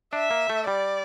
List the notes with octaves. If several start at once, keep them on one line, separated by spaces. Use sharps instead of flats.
D4 E5
A#3
A3
G3 D5